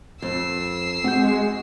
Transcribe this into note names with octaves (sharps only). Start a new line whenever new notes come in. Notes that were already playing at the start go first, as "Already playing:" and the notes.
F2 E6 C7
G#3 C4 F#4 G6